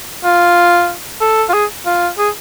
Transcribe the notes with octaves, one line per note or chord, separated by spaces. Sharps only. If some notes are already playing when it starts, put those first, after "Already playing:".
F4
A4
F4
G#4
F4
G#4